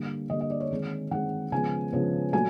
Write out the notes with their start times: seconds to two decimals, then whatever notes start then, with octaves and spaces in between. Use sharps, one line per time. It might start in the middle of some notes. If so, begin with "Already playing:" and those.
Already playing: D3 G3 A#3
0.30 D3 G3 A#3 D#5
0.41 D#5
0.50 D5
0.60 C#5
0.70 D#3 G#3 C4
1.11 D#3 G#3 C4 F#5
1.52 C#3 F3 G#3 B3 G#5
1.93 C#3 F3 G#3 B3
2.33 A#2 F#3 A3 G#5